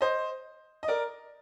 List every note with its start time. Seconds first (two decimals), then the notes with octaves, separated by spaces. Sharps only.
0.01 C5 D#5
0.83 D#5
0.88 A#4 D5